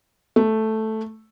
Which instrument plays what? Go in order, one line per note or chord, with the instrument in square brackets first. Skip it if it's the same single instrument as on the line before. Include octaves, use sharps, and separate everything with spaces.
[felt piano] A3